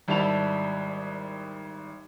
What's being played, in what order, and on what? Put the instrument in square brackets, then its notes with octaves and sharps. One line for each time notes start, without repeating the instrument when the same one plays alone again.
[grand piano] G#1 G3 E4 A5 B5 F7